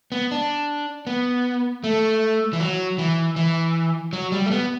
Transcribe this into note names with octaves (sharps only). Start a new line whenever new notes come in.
B3
D4
B3
A3
E3
F#3
E3
E3
F#3
G3
A3
B3